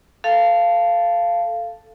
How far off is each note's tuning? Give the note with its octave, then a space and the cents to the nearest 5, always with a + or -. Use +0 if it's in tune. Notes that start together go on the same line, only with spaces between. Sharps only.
A4 +0 F5 -15 A5 +0